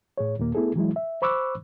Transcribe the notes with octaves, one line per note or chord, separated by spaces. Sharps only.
A2 G#4 C#5
D#2 A#2 A#3
A3 B3 E4 G#4 A4
E3 F#3 G#3 E4
E5
C5 B5 C#6 D6 E6 F#6